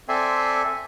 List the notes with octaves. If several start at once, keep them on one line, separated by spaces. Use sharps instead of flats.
C4 A4 D5 E5 G#5 C6